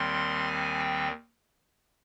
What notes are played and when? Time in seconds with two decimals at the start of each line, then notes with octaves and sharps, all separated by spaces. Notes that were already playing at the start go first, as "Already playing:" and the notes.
Already playing: D#2 D#3 G3 C4 C6
0.47 G#5
0.79 G5